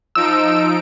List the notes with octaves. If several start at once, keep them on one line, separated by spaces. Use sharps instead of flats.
F3 D#4 E6 D7